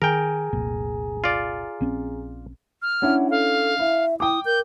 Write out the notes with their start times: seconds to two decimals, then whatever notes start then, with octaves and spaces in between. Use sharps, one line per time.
0.02 D#3 G#4 A#4 G5 G#5 A#5
0.53 F1 C2 A#2
1.24 F4 D5
1.81 A#1 C4 C#4
2.82 F6
3.02 C#4 D4 E4 F#5
3.30 A4 F5
3.79 E4 E5
4.20 E4 G5 D6 D#6
4.46 A#4 G6